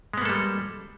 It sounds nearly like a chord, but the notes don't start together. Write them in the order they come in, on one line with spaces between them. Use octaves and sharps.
G#3 B3 A#3 A4 G3